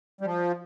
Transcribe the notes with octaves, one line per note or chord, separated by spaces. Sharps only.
G3
F3